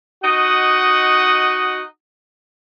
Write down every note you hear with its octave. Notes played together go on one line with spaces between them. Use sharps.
D#4 F#4 D#5 F#5